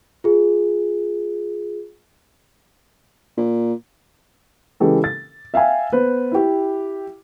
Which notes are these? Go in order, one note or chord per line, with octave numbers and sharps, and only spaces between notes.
F4 G#4
A#2
C#3 E3 G#3 G4 A4
A6
E5 F5 G5 G#5
B3 B4 C5
E4 G4